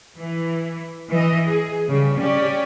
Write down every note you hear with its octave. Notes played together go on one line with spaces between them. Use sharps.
E3
E3 D#5
G#4
C#3 G3
C#4 G4 D5